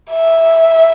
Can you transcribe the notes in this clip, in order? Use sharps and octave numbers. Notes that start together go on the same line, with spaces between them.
E5